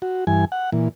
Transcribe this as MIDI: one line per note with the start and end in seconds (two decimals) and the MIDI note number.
0.02 0.25 66
0.27 0.45 43
0.27 0.45 52
0.27 0.45 80
0.52 0.70 78
0.72 0.89 46
0.72 0.89 52